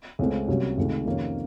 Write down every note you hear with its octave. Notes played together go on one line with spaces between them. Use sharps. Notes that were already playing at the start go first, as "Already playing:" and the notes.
C#2 C#3 A3 C4
C2 C3 F#3 A#3 C#4
C#2 C3 D#3 A3
F2 C3 D#3 A#3 C#4